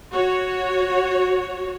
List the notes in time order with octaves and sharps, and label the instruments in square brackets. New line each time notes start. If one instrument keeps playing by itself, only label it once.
[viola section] F#4 C#5